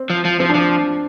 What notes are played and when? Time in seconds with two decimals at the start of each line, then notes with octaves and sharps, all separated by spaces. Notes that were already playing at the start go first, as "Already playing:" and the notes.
Already playing: C4
0.10 F3
0.25 F3
0.40 F3 C4
0.49 D4
0.55 F3